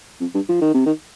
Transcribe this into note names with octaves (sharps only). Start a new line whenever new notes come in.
F2
G2
F3
D#3
C3
D#3